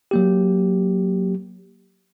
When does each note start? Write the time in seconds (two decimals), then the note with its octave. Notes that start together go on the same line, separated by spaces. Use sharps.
0.11 F#3 A#3 G4